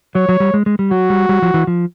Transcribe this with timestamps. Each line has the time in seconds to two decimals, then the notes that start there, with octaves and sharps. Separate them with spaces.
0.15 F#3 C#5
0.29 F#3
0.40 G3
0.54 G#3
0.66 G#3
0.79 G3
0.91 F#3 F#4
1.10 G3
1.29 G3
1.42 F3
1.54 E3
1.67 F3